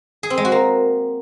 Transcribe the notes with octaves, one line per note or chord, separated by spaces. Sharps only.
G#4
C4
G#3
F#4
A#3